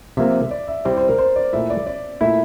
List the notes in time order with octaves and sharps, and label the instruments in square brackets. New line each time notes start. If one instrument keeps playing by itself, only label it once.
[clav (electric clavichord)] C3 F3 A#3 [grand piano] E5
[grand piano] D5
E5
[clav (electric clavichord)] C3 G3 C4 E4 [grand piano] D5
[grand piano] C5
A#4
C5
D5
[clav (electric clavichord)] A#2 A3 E4 [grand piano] E5
[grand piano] D5
D5
[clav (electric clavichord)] A#2 A3 E4 [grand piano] E5